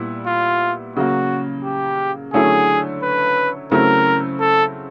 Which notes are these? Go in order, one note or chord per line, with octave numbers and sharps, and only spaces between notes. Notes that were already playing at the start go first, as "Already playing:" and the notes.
Already playing: A#2 G3 B3 E4
F4
C#3 F#3 A#3 F#4
G4
D3 F#3 A3 C#4 E4 G#4
B4
C#3 F#3 A3 C4 E4 A#4
A4